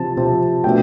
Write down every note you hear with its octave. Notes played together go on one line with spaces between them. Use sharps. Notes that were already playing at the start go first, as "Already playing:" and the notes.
Already playing: C3 F3 C4 A5
C3 F3 C4
B2 A3 D4 G5